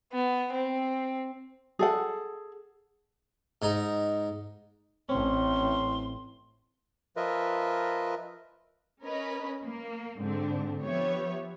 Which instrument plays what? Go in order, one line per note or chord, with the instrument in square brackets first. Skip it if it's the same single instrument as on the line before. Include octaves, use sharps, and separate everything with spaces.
[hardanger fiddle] B3
C4
[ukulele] G#4 A4 F#5
[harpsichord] G#2 D#4
[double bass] A1 A2 [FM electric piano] C4 [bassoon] C#4 [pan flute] C6
[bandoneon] F3 F4 A#4 B4 D#5 E5
[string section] C#4 A#4 B4 D#5 B5
A#3
G#2 D3 C4 D4
F3 B3 G4 C#5 E5